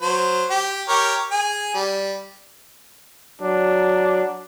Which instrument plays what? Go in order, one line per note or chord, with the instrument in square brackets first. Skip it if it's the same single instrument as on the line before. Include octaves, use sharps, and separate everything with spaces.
[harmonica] F#3 C5
G4
G4 A#4 C#5
G#4 G#5
G3
[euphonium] F#3 [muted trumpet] D4